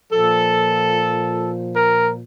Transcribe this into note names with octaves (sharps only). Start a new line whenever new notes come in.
A#2 F3 A4
A#4